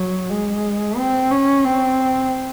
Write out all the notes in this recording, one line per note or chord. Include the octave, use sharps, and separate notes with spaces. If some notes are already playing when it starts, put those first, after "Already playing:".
Already playing: F#3
G#3
C4
C#4
C4